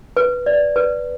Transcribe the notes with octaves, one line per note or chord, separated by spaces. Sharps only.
B4
D5
B4